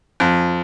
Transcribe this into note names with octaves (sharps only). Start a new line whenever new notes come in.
F2